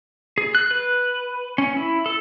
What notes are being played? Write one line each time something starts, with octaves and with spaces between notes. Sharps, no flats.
G#4
F#6
B4
C#4
E4
A4